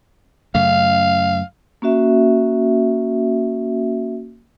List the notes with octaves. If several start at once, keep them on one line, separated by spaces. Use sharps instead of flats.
F#2 C#3 A3 F5
A#3 C#4 F#4 E5